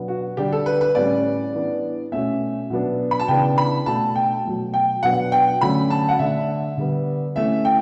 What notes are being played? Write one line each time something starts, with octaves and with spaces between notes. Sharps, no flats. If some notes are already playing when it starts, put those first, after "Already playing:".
Already playing: B2 F#3 B3 D4
F#4
D3 G3 D4 G4
A4
B4
B4
A2 E3 G3 C#4 D5
E3 B3 D4
B2 A3 C#4 E5
B2 F#3 B3 D4
B5
A5
C#3 E3 B3 D4 G5
B5
B2 A3 D4 A5
G5
B2 F#3 A3
G5
B2 F#3 B3 D4 F#5
G5
D3 F#3 A3 C#4 B5
A5
F#5
D3 A3 D4 E5
D3 G3 B3
E3 A3 C#4 E5
G5